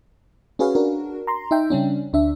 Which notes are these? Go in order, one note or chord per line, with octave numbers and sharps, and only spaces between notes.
C#4 F#4 G#4 B4 C#5 F5
D4 F#4 A#4
A#5 C6
D#4 E5 G5
C#3 G3 C#4 D4
D2 D4 E5